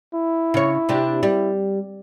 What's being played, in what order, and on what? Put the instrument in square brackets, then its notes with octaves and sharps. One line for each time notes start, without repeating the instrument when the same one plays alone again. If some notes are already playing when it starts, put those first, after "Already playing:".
[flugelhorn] E4
[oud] C#3 C#5
C3 D4 G4
G3